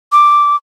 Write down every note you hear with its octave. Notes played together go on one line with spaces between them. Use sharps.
D6